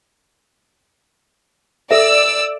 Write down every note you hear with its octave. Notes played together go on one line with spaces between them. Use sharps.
A4 D5 E5 E6